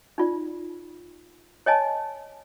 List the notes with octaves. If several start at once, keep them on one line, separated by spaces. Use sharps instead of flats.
D#4 F4 D5
C#5 D#5 G#5 A5